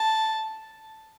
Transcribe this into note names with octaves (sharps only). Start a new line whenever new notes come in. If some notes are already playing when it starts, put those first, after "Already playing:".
Already playing: A5